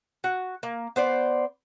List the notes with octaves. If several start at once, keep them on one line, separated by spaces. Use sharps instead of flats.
F#4
A#3
B3 C5 D5